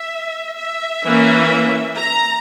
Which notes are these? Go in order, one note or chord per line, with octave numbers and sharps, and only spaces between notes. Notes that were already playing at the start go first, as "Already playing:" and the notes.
Already playing: E5
E5
E3 A#3 C#4
A#5